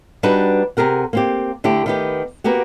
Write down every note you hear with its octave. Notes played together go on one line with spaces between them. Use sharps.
G3 D4 D#4 F#4 B4
C3 G4 G#4 A#4 F#5
A#3 C4 G4
D3 A3 E4 G4
D#3 B3 G4
A#3 B3 F#4 G4